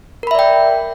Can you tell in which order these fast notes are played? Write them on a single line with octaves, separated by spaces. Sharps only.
A#4 B5 E5 D5 G5